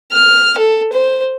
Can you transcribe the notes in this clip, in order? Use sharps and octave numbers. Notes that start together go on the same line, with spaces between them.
F6
A4
C5